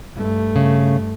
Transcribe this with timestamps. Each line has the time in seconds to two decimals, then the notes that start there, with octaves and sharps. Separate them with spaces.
0.14 G2 A3
0.56 C#3